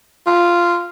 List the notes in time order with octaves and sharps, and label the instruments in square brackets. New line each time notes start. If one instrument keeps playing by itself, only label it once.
[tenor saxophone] F4